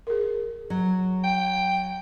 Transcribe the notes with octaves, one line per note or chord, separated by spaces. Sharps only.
G#4 A#4
F#3
G5